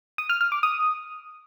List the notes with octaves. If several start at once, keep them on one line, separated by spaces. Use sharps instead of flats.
D#6
F6
F6
D6
D#6